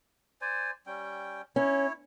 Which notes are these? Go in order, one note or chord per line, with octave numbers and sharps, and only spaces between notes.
C5 D5 G#5
G3 C#4 G5
C#4 E4 C#5